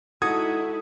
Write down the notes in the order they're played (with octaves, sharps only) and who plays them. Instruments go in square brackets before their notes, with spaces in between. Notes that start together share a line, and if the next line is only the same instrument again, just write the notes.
[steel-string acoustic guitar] G#3 A4 [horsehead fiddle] D#4 E4 [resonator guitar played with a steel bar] F#4 [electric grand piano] D#6 G#6